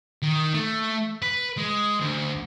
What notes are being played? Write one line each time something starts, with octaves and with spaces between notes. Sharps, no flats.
D#3
A3
B4
G#3
D2